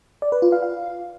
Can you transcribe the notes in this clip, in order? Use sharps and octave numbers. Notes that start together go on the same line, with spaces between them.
D5
B4
F4
F5
F5